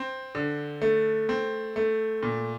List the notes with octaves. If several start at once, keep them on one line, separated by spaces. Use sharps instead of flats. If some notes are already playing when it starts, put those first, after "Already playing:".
Already playing: C4
D3
A3
C4
A3
A#2